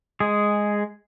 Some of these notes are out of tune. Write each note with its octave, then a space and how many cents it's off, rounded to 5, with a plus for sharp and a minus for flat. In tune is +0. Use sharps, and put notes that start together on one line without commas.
G#3 +0 G#4 +0